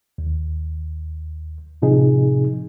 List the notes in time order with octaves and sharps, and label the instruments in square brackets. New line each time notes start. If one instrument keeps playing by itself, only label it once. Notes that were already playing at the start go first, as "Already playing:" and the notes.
[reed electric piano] D#2
A2 C3 F3 D#4 G#4